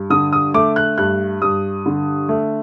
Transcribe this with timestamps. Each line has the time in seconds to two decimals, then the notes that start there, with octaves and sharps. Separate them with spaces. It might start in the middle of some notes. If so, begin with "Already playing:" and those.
Already playing: G2
0.10 D3 D#6
0.33 D#6
0.54 A3 D6
0.76 F#6
0.98 G2 F#6
1.42 G2 D#6
1.86 D3
2.29 A3